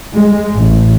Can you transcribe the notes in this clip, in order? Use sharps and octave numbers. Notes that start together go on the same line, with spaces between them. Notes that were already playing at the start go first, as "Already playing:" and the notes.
G#3
A1